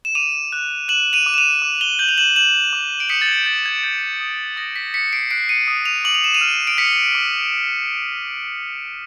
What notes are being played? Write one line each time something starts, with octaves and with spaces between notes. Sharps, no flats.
E7
D6 D#7 F7
F#6
F#6 E7 F#7
D#7 F7
D6
E7
D#7 F7
D6
F7 G7
G6 E7 F#7
F7
E7 F#7
G6 E7 F#7
D6
D7
D#6 B6 C#7
A6
G#6
G6 A6
G#6
G6 A6
D#6
D#6 A#6
B6
F#6 B6 C#7
C7 D7
F#6 C7 D7
C#7 D#7
D#6
D#7 F7
D6 F#7
F7
E7
D#7 F7
F6
D7
F6 B6 C#7
D6